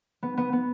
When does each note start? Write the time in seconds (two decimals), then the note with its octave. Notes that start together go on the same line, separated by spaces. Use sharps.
0.23 B3
0.37 B3
0.53 B3